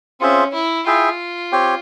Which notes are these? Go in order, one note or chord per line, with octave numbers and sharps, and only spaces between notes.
C4 C#4 F4 G#4 C5 E5
E4
E4 F4 G#4 E5 G5
C4 G4 C#5 G5